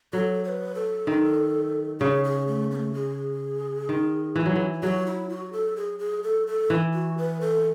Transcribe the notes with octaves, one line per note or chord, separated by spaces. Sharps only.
F#3 A4
C#5
B4
A4
D#3
C#3 G#4
G#4
A3
B3
A3
G#4
D#3
E3
F#3
E3
F#3 F#4 G#4
E4
F#4
A4
G#4
G#4
A4
A4
E3
F#4
B4
A4